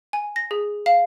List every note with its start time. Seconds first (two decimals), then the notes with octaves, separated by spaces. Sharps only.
0.13 G#5
0.36 A#6
0.51 G#4
0.86 F5